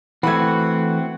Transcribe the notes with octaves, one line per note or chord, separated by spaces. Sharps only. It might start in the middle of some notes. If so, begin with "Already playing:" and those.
E3 A3 C4 F#4 F#5 B5 G#6